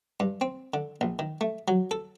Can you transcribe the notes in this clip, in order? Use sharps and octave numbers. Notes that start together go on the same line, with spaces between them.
G2
C4
D3
A#1
D#3
A3
F#3
A4